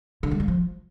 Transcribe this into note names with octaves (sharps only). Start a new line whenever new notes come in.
D3
G#3
G3
F3